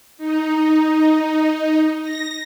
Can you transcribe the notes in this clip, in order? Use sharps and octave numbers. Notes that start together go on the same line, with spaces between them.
D#4
A#6